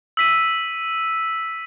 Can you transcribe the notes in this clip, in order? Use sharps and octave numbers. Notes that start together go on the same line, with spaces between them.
E6 B6 D#7